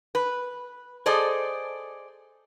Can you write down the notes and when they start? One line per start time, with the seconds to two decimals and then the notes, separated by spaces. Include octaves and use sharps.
0.15 B4
1.06 G#4 A4 C5 D5 D#5